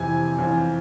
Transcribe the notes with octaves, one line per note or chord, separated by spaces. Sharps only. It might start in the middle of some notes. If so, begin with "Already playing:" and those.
Already playing: F2 C3 E3 G#5 G#6
F2 E3